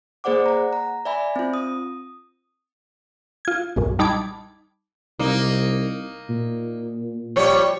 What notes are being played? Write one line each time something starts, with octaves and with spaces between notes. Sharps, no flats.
A#3 G#4 C5 D5 F#5 D6
F#5 A#5
A#5
D5 E5 G#5 B5
C4 F4
D#6
F4 G#6
B1 F#2 A#2
G3 D#4 A5 B5 D6 G#6
C2 A#3 D#4
A#2
F3 G3 C#5